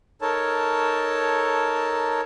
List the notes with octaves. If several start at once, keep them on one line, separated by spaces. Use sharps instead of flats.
D#4 A4 A#4 C#5 A5